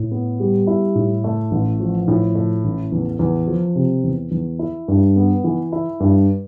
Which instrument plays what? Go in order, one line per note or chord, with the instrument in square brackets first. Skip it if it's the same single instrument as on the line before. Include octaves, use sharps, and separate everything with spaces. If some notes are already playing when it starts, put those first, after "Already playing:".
Already playing: [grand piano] A2
B3
G3
E4
A2
A3
A1
F3
A2
A3
A1
E2
E2
F3
C3
E2
E2
E4
G2
B3
E3
E4
G2